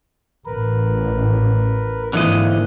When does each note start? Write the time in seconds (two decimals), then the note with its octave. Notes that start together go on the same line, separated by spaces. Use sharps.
0.45 A1 A#4 B4
2.13 G#2 D3 E3 A#3 C4 F4 D#5